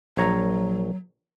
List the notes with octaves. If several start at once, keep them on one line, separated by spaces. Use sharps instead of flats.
A#1 F#3 C#5 A#5